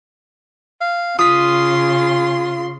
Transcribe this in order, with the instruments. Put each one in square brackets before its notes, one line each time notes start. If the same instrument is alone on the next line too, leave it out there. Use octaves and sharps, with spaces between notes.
[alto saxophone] F5
[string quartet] C#3 C6 [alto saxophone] F4 [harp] D#6 B6